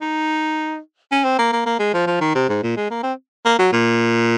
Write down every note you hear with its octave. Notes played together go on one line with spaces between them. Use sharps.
D#4
C#4
C4
A#3
A#3
A#3
G#3
F3
F3
D#3
C3
G#2
A#2
G#3
A#3
C4
A#3
F#3
A#2